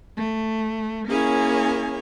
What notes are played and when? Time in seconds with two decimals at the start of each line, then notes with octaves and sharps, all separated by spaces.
0.16 A3
1.07 A#3 C#4 E4 G#4 C#5 G#5